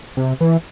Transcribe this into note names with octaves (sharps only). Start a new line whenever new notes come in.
C3
E3